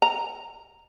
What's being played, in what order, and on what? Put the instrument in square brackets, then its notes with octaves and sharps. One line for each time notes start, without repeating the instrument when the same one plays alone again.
[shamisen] A#5